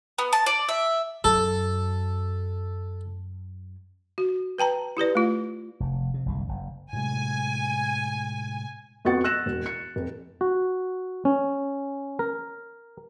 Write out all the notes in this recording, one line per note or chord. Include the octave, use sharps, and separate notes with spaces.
B3
A5
D5
E5
F#2 A4
F#4
B4 G5 A5 A#5
E4 G4 B4 D5
A3 F4
F1
C3
F#1 C2 D3
F#1
A2 C3 G#3 G#5
F2 B3 F#4 F#5 A6 C#7
E6 F#6 A#6 E7
E1
C#7
F1
F#4
C#4
A#4